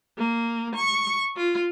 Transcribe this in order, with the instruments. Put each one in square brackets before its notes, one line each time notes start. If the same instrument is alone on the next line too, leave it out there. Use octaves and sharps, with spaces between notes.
[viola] A#3
C#6
F4